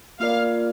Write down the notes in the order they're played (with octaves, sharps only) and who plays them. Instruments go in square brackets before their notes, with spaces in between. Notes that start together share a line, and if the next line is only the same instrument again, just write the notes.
[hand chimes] A#3 F4 A#4 D5 [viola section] F5